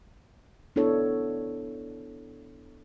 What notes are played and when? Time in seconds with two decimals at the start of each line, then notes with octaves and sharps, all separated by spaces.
0.76 B3 D4 E4 A4 C#5